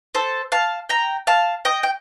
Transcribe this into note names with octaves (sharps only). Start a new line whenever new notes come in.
A4 C5
F5 A5
G5 A#5
F5 A5
D#5 G5
G5